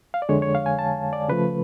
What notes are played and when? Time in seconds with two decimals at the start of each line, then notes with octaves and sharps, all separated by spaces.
0.14 F5
0.22 D5
0.29 F2 D3 G#3 C#5
0.42 C#5
0.55 F5
0.66 G#5
0.79 A5
1.13 D5
1.29 C#3 F3 A3 B4